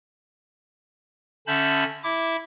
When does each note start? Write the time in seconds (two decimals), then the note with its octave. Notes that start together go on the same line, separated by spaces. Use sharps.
1.47 D3 C#4 E5 A5 B5 G6
2.03 E4 E5 D6